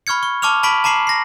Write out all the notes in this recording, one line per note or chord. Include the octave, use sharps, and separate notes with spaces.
B5 C#6 F6 G#6 C#7
C#6
A5 C#6 D6 F6 F7
A5 B5 C#6 B6 D7 F#7
A5 A#5 D6 C7 F#7
A#6 C7